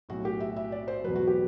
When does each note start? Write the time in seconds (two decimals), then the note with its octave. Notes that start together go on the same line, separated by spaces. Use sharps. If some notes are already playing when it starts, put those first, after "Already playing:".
0.09 B1 A2 F#3 F#4
0.25 G4
0.40 E5
0.56 E5
0.72 D5
0.88 C5
1.04 E2 B2 F#3 B4
1.16 F#4
1.27 G4